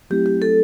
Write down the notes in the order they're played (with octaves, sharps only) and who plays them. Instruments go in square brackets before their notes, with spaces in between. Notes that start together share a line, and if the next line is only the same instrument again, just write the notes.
[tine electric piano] F#3 A3 C4 E4 [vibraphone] G4
[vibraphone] G4
A4